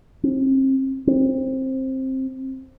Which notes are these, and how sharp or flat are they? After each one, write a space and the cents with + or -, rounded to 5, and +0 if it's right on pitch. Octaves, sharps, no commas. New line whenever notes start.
C4 +35
C4 +15